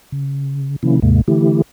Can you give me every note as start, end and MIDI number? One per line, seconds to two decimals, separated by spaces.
0.12 0.76 49
0.83 1.00 48
0.83 1.00 51
0.83 1.00 53
0.83 1.00 58
0.83 1.00 61
0.83 1.00 64
1.02 1.21 39
1.02 1.21 44
1.02 1.21 48
1.02 1.21 56
1.02 1.21 58
1.28 1.62 50
1.28 1.62 52
1.28 1.62 57
1.28 1.62 64
1.28 1.62 67